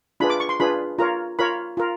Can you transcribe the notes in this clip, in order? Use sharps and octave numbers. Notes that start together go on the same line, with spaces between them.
D4 F4 G#4 B4 B5
D6
C#6
C6
D4 F4 G#4 B4 B5
F4 A#4 C#5 A#5
F4 A#4 C#5 B5
F4 A#4